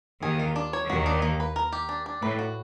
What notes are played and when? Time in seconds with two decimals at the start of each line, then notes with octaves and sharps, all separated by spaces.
0.22 D#2 D#3 G#4
0.39 F4
0.56 D4
0.73 C#5
0.89 D#2 D#3 F#4
1.06 D4
1.22 A#3
1.40 B4
1.56 A#4
1.73 G4
1.89 D4
2.06 D4
2.22 A2 B4
2.39 F#4